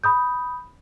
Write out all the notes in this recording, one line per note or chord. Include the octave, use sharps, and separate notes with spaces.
B5 D#6 G6